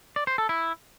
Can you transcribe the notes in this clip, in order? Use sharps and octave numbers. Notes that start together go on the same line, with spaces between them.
D5
C5
A4
E4